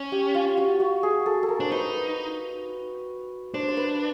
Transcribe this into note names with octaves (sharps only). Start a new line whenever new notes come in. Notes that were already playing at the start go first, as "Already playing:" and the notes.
Already playing: C#4
G4
F4
F#4
F#4
G#4
A4
A4
A#4
D4 C5
D#4 B4
D4 C5
C5
B4